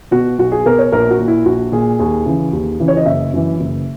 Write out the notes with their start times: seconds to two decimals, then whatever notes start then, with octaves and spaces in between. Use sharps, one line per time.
0.11 B2 F#4
0.38 B1 F#4
0.52 G#4
0.66 B2 A#4
0.78 C#5
0.92 A#1 A#4
1.11 F#4
1.19 A#2
1.28 E4
1.46 A#1 F#4
1.72 A#2 G#4
1.99 D#2 G#4
2.26 C#3 E3
2.53 D#2
2.80 C#3 E3
2.88 C#5
2.97 D#5
3.06 F#1 E5
3.33 F#2 E3
3.60 F#1